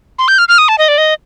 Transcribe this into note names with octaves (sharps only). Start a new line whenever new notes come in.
C6
G6
F6
F6
D#6
A5
D#5
D5
D#5